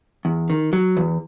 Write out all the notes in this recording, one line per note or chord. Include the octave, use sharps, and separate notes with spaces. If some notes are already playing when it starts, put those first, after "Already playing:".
E2
D#3
F#3
E2